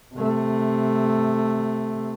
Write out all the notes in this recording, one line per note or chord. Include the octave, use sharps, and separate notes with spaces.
C3 A3